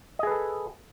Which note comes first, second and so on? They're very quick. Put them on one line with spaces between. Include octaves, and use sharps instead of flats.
D#5 G#4 B4 A4